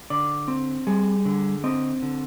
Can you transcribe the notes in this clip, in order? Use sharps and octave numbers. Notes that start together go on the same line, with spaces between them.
D3 D5
C4
G3 G#4
D3
C4 D#5
D3